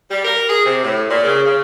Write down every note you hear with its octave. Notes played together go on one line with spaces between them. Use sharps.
G3
A#4
G#4
C3
A2
A#2
C#3
C#3